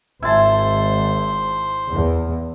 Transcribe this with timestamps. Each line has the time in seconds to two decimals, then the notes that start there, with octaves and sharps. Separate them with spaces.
0.22 G#1 E4 C5 A5
1.90 E2